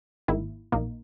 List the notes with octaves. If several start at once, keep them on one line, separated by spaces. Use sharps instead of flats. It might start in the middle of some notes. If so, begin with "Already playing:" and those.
G#1 G#2 D#3 A#3 E4
A#1 A#2 A#3 D#4